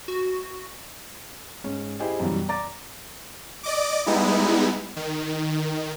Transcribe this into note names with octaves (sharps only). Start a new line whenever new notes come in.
F#4
G#2 C#4
E4 G4 G#4 C5 D#5
F#2 B2 E3 F#3 G3
D5 A#5 D6 A6
D5 D#5 D6
G3 G#3 B3 D#4 E4
D#3